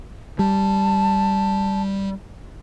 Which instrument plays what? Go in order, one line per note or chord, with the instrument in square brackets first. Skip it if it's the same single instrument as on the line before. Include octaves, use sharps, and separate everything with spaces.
[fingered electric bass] G3 [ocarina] A5